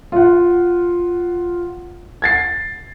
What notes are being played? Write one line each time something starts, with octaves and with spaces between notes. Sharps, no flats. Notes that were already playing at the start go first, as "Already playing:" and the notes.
F4 F#5
G#6 A6 C7